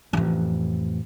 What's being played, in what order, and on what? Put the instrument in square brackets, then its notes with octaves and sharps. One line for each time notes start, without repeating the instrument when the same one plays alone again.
[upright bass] A1 F2